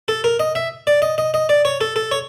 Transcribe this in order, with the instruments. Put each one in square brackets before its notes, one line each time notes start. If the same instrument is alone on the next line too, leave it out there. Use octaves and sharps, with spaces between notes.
[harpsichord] A4
A#4
D#5
E5
D5
D#5
D#5
D#5
D5
C#5
A4
A4
C#5